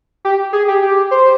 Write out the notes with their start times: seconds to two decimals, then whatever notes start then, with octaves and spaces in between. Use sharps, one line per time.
0.25 G4
0.53 G#4
0.68 G4
0.82 G4
1.11 C5